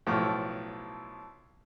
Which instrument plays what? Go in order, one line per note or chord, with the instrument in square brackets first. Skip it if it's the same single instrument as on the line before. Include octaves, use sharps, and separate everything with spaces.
[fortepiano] B1 A2 F3